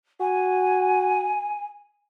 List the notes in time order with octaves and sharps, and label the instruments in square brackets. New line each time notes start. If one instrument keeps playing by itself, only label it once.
[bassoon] F#4 [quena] G#5